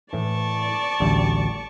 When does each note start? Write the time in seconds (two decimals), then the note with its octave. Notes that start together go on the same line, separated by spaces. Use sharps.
0.13 A2 E3 D5 A5 C#6
1.00 A1 D2 G3